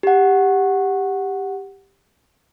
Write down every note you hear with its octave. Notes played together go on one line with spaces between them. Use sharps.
G4 F#5